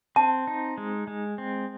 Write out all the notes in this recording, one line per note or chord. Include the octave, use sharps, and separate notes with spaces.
C4 A5
D#4
G#3
G#3
C4